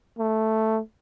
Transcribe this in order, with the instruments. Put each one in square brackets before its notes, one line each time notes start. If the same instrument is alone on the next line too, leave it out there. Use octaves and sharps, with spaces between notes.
[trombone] A3